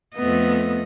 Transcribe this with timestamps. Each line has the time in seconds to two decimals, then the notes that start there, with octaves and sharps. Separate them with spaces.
0.16 F2 A3 B3 D#5